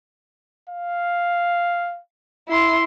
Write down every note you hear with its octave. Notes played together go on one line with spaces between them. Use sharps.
F5
E4 C6